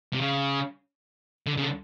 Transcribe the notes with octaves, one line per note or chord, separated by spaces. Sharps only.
C3
C#3
D3
C#3
D3